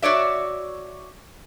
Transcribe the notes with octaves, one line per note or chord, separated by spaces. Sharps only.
F#4 C#5 D5 E5